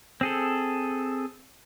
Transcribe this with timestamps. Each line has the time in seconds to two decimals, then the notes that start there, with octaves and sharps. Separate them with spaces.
0.21 C4 G#4 A4